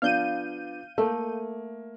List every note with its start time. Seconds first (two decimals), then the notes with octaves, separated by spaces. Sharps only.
0.02 F3 B3 D4 F5 G6 D#7
0.98 A3 A#3